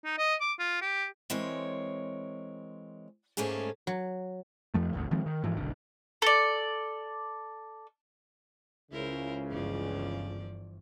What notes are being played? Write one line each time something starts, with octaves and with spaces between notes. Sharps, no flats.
D#4
D#5
D6
F4
G4
E3 G#3 C4 A#4 C#5
G#2 A3 A#3 C#4 G#4
F#3
F2 F3 A3
D#1 G#1 D2
D#3 F3 G#3 C4
D#3
G#2 E3 F3
F#1 B1 D3
A4 D5
C#2 C#3 E4 A#4 C5
G1 E3 F3 D5